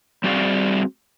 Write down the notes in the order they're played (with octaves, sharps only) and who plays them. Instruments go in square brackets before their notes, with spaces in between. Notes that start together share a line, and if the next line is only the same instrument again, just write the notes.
[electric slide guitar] G3 C4 F#4 G#4 D5 F5